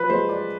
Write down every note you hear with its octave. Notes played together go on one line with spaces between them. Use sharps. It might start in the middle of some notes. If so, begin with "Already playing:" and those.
Already playing: F3 B4
G#3 C5
D5